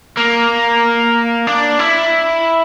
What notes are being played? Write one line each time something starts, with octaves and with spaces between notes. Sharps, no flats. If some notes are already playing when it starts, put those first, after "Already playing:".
A#3
D4
E4